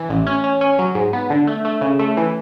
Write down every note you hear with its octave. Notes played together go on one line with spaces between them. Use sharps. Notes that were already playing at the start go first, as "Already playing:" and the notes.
Already playing: E3
A1
C#4
C#4
C#4
F#3
G#2
B3
D3
A3
A3
C#3
A3
E3